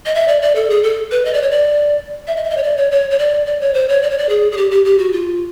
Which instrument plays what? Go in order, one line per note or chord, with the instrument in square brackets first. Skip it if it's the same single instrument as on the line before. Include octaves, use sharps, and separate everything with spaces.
[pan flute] D#5
E5
D5
D5
A4
G#4
A4
B4
D#5
D5
C#5
D5
E5
D#5
E5
D#5
C#5
D5
C#5
C#5
C#5
D5
D5
C#5
C5
C#5
D5
C#5
D5
G#4
G#4
G4
G4
G4
F#4
F4